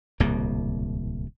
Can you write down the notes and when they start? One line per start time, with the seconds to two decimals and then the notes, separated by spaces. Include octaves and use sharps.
0.20 D1 C2 B2 A#3